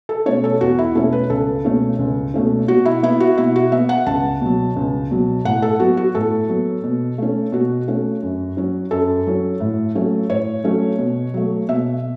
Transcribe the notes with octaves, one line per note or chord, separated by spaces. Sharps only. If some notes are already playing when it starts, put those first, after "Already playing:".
A4
B2 A3 C#4 C#5
A4
E2 F#4
E4
B2 A3 C#4 A4
B4
C#2 A4
B2 A3 C#4
C#2
B2 A3 C#4
B2 F#4
E4
B3 E4
F#4
B2 E4
F#4
B3 E5
F#5
C#2 A5
B2 F#3
C#2
B2 F#3
A2 F#5
A4
F#3 B3 F#4
F#4
A2 A4
F#3 B3
B2
A3 C#4
B2 F#4
A3 C#4
F#2
F#3 C#4
F#2 A4
F#3 C#4
A2
F#3 A3 C#4
A2 C#5
F#3 A3 C#4
B2
F#3 A3
B2 E5